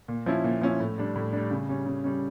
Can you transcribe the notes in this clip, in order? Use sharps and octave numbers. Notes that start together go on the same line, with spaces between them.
A#2
F3 C#4 E4
A#2
F3 C#4 E4
A2
G3 D4
A2
G3 D4
C#3
G3 C#4
C#3
G3 C#4